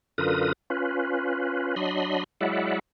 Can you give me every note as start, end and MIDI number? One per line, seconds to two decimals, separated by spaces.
0.18 0.52 42
0.18 0.52 50
0.18 0.52 65
0.18 0.52 70
0.18 0.52 71
0.18 0.52 87
0.70 1.75 61
0.70 1.75 65
0.70 1.75 71
1.76 2.24 54
1.76 2.24 62
1.76 2.24 75
1.76 2.24 83
1.76 2.24 84
2.41 2.79 54
2.41 2.79 56
2.41 2.79 64
2.41 2.79 74
2.41 2.79 76
2.41 2.79 78